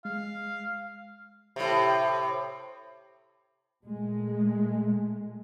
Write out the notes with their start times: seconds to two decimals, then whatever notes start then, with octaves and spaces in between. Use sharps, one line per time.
0.05 G#3 F5
1.56 A2 C3
3.84 A#2 G#3 A3